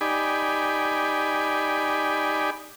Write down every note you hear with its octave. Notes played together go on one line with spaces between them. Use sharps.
D#4 G4 D5 G#5 B5